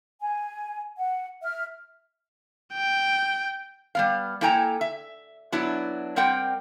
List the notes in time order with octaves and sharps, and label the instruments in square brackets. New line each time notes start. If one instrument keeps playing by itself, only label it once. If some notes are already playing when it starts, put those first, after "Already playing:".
[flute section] G#5
F#5
E5 F6
[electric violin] G5
[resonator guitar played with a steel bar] G3 B3 F5
A#3 E4 A4 G5 G#5 A#5
E5
F#3 B3 D4 E4
G3 C4 A#4 F#5 G5